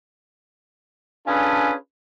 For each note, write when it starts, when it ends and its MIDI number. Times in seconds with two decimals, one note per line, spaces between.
1.27 1.74 61
1.27 1.74 62
1.27 1.74 65
1.27 1.74 68
1.27 1.74 69
1.27 1.74 71